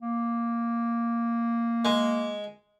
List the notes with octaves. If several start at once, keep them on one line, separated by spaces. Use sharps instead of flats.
A#3
G#3